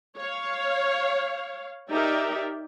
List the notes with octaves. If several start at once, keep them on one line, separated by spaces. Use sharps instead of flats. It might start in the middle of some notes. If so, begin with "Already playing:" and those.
C#5 F5
D#4 G4 A#4 D5 E5 G5